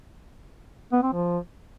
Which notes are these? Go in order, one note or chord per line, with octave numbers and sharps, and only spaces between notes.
B3
C4
F3